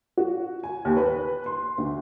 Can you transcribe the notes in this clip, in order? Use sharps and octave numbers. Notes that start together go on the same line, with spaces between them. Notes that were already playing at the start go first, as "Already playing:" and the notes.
F#4
G#5
D#2
B4
C6
D2